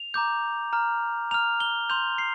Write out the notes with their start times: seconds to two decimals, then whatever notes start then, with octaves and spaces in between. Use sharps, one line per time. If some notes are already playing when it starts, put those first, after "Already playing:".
Already playing: F7
0.14 A#5 D6 G6
0.73 A#5 F6
1.31 A#5 F6 F7
1.60 G7
1.89 C6 G6 F7
2.18 C7